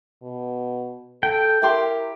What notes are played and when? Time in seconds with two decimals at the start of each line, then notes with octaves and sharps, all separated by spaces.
0.23 B2
1.23 A4 G5
1.62 E4 G4 A#4 C6